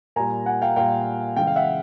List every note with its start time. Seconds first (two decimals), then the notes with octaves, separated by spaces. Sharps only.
0.16 A#2 G3 G#5 A#5
0.46 F#5 G#5
0.62 F5 G5
0.76 A#2 G3 F5 G5
1.36 C#3 E3 G#3 F5 G5
1.47 F5
1.56 E5 F#5